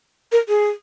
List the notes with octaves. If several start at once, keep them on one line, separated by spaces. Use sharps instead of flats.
A#4
G#4